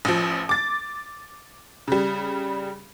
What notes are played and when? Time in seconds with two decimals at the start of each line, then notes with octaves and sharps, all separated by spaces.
0.05 A1 F3
0.49 D6 A6
1.88 C#3 G3